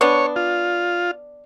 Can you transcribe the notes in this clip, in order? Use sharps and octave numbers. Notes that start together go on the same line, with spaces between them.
B3 D4 C#5
F4